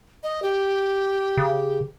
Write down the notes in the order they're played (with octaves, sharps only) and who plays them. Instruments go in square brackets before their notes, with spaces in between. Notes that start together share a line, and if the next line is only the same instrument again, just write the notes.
[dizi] D#5
G4
[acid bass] C#3